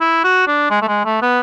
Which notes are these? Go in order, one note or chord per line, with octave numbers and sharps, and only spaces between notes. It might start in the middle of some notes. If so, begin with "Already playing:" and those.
E4
F#4
D4
G#3
A3
G#3
A3
B3